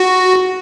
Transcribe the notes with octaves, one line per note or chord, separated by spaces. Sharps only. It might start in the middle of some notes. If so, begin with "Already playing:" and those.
Already playing: F#4